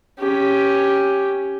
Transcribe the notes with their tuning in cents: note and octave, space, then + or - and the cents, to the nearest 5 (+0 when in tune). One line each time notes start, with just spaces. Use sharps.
C#4 +0 G4 +0